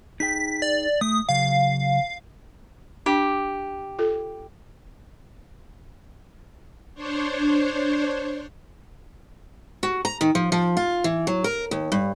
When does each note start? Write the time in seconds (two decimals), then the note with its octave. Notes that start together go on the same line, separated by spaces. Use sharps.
0.20 D#4 G#4 G5 B6
0.62 D5
1.01 A3 D#6
1.29 C#3 F#3 F5
3.06 D4 G4
3.99 F4 A4
6.94 D4 C5 C#5
9.83 F#4
10.05 A#5
10.21 D#3
10.35 F3
10.52 F3
10.77 F4
11.04 E3
11.27 F#3
11.44 A#4
11.71 D#2
11.92 G2